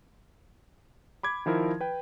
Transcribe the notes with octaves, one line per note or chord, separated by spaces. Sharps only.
B5 D6 G#6
D#3 F3 E4 A#4
B4 G5